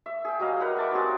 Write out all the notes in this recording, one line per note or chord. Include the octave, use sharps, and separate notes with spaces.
E5
G#4 G5
F#3 G3 D#5 F5
A#4 B4 F#5 G5
E5 A5 D6
F#3 G3 C4 G#4